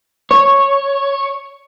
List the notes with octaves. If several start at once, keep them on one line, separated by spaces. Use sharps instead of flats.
C#5